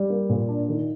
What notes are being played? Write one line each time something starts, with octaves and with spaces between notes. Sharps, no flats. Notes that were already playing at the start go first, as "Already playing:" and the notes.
Already playing: G3
A#3
A#2
D4
D#3